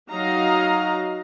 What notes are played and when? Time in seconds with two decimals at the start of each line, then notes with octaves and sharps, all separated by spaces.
0.10 F#3 D#4 D#5 F5 A#5